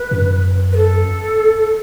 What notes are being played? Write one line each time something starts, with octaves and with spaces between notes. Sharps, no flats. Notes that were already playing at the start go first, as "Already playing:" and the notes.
Already playing: B4
F#2
B4
A4